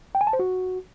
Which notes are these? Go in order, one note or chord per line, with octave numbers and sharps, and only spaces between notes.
G5
G#5
A5
C5
F#4